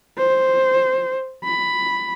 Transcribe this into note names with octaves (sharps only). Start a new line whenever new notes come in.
C5
B5